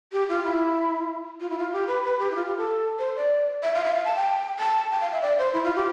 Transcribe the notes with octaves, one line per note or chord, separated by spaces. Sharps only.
G4
F4
E4
F4
E4
F4
G4
B4
B4
G4
E4
F4
G4
A4
C5
D5
E5
F5
E5
F5
A5
G5
A5
G5
F5
E5
D5
C5
E4
F4
G4